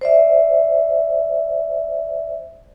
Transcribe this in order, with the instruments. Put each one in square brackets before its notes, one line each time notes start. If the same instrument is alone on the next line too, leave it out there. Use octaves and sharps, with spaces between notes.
[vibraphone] C5 D5 E5